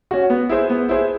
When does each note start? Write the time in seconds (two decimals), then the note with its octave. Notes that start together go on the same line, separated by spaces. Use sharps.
0.11 C#4 F#4
0.30 B3
0.49 E4 G#4 C5
0.70 B3
0.89 E4 G#4 C5